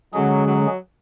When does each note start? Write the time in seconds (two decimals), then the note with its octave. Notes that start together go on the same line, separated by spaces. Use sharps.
0.14 D3 F#3 G#3 C#4 G#4
0.46 F#3